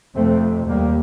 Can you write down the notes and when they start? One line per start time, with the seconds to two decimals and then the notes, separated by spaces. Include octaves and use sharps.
0.15 F2 C3 A3 C4
0.69 D#2 G3 A#3